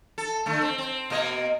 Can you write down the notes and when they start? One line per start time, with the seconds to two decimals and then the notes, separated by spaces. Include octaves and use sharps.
0.18 A4
0.46 D3 A3
0.62 C4
0.78 C4
1.10 B2 A#3 D#5